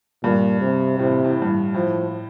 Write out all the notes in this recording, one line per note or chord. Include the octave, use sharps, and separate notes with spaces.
G2 A#2
C3
A2 C3
A2
G2
A2
A2 F3